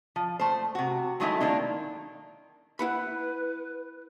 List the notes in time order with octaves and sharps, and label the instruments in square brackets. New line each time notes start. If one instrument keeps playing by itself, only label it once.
[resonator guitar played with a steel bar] F3
A3 C5
C3 F#4
D#3 F#3 G#3 A3 D#4 E4
D#3 A#3 D4 D#4
[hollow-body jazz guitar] E4 F#5 B5 [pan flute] B4